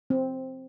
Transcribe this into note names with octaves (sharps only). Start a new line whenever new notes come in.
C4